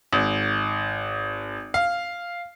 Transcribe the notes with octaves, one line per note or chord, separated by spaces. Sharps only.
G#1
F5